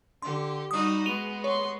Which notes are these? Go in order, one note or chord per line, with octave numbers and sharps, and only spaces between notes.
D3 G4 C6
G3 D#4 F#4 D#6
G#3 B3 D#7 F7 G7
C#5 C6 C#6